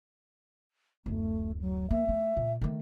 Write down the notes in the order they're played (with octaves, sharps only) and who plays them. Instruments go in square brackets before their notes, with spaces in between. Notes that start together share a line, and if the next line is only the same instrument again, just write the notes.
[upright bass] D1 F#2 [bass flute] A3
[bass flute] F#3
[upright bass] A#3 [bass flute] E5
[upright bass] A3
A#2
D#3 A3